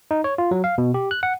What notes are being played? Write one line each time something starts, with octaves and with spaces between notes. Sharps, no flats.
D#4
C#5
F4
F#3
F5
B2
G4
F#6
F#5